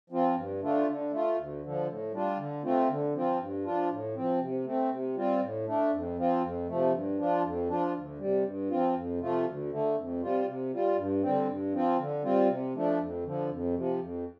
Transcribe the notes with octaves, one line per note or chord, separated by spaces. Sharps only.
F3 C4 F4
G2
D3 A3 D4 F4
D3
A3 F4
D2
D3 F3
A2
G3 D4 F4
D3
A3 C4 F4
D3
F3 C4 F4
G2
F3 D4 F4
A2
F3 C4
C3
A3 C4
C3
G3 C4 F4
A2
A3 D4
F2
F3 C4 F4
F2
C3 F3 A3
G2
F3 D4 F4
F2
F3 D4 F4
D2
C3 G3
G2
F3 C4 F4
F2
C3 F3 A3 F4
D2
D3 A3
F2
C3 G3 F4
C3
G3 F4
G2
D3 G3 C4
G2
F3 C4 F4
D3
G3 C4 F4
C3
F3 A3 D4
F2
D3 F3
F2
C3 F3
F2